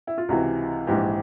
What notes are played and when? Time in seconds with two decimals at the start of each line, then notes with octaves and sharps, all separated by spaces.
0.07 E4
0.18 F4
0.28 C#2 C3 E3 F#4
0.87 A#1 G#2 E3 G4